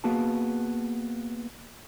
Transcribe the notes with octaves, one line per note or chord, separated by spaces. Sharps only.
A#3 B3 F#4 G#4 A5